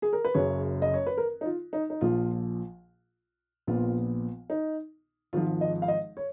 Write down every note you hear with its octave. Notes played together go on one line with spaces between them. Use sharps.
G#4
A#4
B4
F#1 F#2 C#3 C#5
D#5
C#5
B4
A#4
D#4
F4
D#4
D#4
A#1 A#2 F3 F4
A#1 A#2 F3 B3 F4
D#4
G#1 G#2 F3 F4
D#5
F5
D#5
C#5